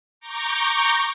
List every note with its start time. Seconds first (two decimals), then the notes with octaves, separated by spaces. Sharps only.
0.20 A#5 C#6 D6 G6